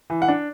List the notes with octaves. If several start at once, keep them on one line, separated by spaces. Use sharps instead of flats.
E3
F#5
D4